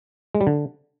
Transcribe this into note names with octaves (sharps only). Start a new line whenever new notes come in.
G#3
G3
D3